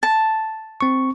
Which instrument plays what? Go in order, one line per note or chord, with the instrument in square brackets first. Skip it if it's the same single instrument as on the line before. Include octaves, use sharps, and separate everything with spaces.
[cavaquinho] A5
[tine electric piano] C4 C#6